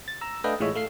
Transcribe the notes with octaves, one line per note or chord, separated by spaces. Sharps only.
A6
A#5 E6
A3 D4 B4 D#5 F5 G5
A2 E3 G#3 F4 C#5 E5
A3 F5 C7